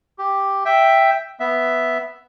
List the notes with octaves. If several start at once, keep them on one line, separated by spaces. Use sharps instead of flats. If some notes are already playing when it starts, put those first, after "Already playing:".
G4
E5 G5
B3 E5